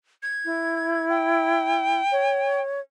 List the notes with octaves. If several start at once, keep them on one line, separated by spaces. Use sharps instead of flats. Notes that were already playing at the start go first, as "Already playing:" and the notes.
G#6
E4
G5
C#5